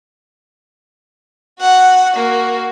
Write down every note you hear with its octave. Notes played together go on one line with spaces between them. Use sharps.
F#4 F#5
A#3 F#4